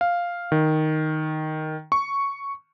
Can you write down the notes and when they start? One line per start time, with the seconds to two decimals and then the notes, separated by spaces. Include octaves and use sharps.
0.01 F5
0.52 D#3
1.92 C#6